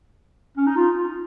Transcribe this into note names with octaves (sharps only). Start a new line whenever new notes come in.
C#4
D#4
F4